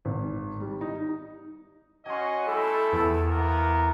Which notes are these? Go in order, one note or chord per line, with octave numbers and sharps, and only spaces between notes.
G#1
G3
D#4
C#4 F#4 D#5 G#5 C6
G3 A3 E4 A4
E2
A#3 B3 A#4